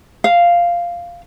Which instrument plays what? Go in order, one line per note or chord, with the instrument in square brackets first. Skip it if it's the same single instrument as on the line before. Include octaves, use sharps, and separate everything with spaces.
[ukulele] F5